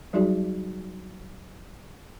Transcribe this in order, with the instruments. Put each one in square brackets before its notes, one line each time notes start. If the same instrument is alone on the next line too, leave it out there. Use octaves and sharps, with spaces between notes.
[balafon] F#3 G3 D#4 F#4 G#4 D5